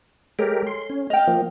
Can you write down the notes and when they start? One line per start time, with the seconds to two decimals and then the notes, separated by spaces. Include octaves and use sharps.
0.39 G#3 G4 A4 A#4 C#5 G#5
0.67 C6
0.90 C#4
1.10 D#5 G5 F6
1.27 F3 A#3